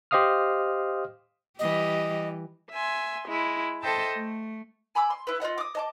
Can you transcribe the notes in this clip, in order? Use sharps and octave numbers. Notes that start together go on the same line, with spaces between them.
G4 C5 D#5 F5 D#6 F6
E3 G3 G4 D#5
E5 G#5 C6
G#3 E4
A4 C5 D#5 E5 G5 A5
A3
G#5 B5 D6 E6
C6
E4 B4
F4 A#4 D#5 F#5
D6 D#6
D#5 A5 D6